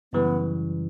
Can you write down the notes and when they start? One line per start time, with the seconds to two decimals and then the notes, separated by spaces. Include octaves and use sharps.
0.13 F#2 C#3 E3 G3 B3